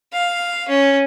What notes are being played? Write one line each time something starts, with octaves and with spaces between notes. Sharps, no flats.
F5
C#4